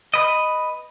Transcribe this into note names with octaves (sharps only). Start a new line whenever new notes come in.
B4 D#5